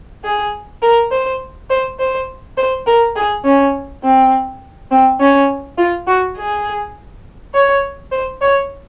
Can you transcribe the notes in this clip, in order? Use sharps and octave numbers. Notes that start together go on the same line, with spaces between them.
G#4
A#4
C5
C5
C5
C5
A#4
G#4
C#4
C4
C4
C#4
F4
F#4
G#4
C#5
C5
C#5